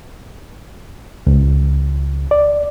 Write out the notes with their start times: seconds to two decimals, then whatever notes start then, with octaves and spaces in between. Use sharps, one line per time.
1.27 C#2
2.31 D5